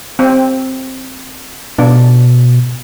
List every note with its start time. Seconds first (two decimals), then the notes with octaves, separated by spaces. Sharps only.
0.19 C4
1.79 B2 D4